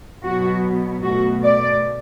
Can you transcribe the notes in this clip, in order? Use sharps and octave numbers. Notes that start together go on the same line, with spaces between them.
B2 F#3 B3 F#4
B2 A3 F#4
D5